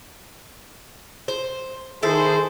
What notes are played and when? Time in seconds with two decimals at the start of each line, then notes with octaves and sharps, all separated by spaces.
1.28 C5
2.03 D#3 E4 G#4 A4 C5